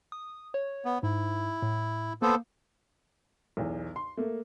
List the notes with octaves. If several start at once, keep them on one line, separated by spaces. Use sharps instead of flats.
D#6
C#5
B3
G#2 E4
A2
A#3 B3 A4 C5
B1 E2
C6
A3 A#3